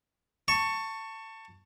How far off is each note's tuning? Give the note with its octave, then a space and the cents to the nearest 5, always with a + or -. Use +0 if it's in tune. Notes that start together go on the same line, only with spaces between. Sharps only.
A5 +25 C#6 +0